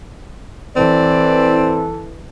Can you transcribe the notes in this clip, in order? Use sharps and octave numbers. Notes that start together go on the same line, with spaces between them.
E3 C4 A4 D5